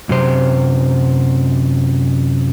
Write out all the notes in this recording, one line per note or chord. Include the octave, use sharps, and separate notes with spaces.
F#2 C3 C5